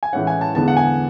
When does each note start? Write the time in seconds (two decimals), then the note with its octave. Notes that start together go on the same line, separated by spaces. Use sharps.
0.03 G#5
0.13 A2 E3 G#3 C#4 F#5
0.27 G#5
0.41 A5
0.55 E2 D3 G#3 B3 A5
0.68 F#5
0.77 G#5